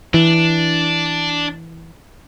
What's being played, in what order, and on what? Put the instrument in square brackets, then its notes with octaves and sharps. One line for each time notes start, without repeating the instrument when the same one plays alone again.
[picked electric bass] E3 [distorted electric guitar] D4